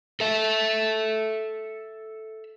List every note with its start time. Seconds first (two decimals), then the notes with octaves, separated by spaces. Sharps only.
0.20 A4 E5